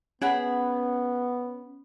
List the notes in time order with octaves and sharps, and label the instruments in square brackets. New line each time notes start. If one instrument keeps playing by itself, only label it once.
[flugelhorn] B3 [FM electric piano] C#4 [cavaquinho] G#4 F#5 B5